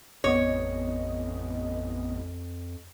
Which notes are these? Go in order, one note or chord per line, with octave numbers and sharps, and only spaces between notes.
A1 F2 B3 C#5 D#5